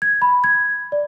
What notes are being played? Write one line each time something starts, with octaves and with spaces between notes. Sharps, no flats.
G#6
B5
G#6
D5